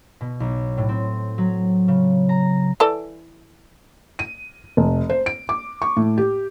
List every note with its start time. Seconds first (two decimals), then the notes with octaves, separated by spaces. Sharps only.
0.21 B2
0.40 B1
0.77 A2
0.89 C4
1.38 F#3
1.88 C#3
2.29 A#5
2.80 E3 A4 D5
4.19 D#7
4.77 F1
5.10 C5
5.26 D7
5.49 D6
5.82 C#6
5.97 A2
6.18 G4